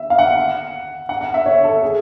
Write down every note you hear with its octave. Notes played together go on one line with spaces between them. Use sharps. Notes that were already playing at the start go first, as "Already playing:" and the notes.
Already playing: E5
F5
F#5
F#5
F#5
E5
C#5
A4
G#4